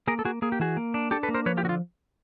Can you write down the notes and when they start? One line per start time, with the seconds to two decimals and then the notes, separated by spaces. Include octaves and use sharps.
0.07 A#3 G#4 A#4
0.19 A4
0.25 A#3 F#4 G#4
0.42 A#3 G#4
0.52 G4
0.59 E3 F#4 G#4
0.77 A#3
0.94 D4
1.11 D4 G4 A4
1.23 A4 B4
1.29 A#3
1.34 A#4 C5
1.46 F3 B4 C#5
1.57 F4 G4
1.63 D3 F#4
1.69 F4